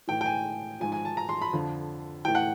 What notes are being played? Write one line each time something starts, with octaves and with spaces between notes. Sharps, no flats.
A2 E3 G5
G5
G#5
G#2 F3 G#5
G#5
A5
A#5
C6
B5
F2 D3 F3
A2 E3 G5
F#5